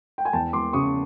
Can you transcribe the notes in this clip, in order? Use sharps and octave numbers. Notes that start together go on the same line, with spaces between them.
G5
G#5
E2 G5 A5
E2 C6 D6
C#3 C#6 D#6